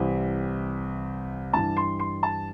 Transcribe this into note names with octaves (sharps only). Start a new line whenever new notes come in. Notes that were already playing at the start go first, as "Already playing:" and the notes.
Already playing: C2 C3 E3 C4
G2 E3 G3 A5
C6
C6
A5